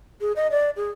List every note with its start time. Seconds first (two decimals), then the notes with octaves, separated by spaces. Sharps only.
0.21 G#4
0.36 D#5
0.51 D5
0.76 G#4